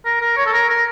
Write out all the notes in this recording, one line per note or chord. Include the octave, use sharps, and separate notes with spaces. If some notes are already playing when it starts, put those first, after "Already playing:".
A#4
A#4
C#5
A4
A#4
A#4